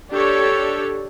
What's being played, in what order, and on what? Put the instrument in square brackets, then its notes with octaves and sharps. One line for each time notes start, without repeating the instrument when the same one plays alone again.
[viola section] D4 G4 A4 C#5